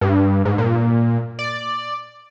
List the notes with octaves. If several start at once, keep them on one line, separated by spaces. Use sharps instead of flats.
G2
G#2
A#2
D5